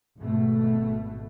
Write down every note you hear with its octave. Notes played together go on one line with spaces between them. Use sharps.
G#1 B2 A3